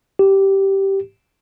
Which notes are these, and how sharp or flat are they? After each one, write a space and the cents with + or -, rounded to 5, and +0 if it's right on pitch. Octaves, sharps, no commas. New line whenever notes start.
G4 -10